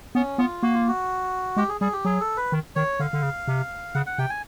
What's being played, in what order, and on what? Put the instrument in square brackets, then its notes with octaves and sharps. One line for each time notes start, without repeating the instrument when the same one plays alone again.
[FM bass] B3 [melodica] C#4
[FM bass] B3 [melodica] F4
[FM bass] A#3 [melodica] F#4
[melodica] F4
F#4
[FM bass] G#3 [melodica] G4
[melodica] G#4
[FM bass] G3 [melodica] G#4
[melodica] G4
[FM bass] F#3 [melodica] G#4
[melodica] A4
B4
[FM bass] D#3
[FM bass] D#3 [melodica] C#5
[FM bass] D3 [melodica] F5
[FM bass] D3
C#3
C3
[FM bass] C#3 [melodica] F#5
[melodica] F#5
[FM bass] C3 [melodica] G5
[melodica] G#5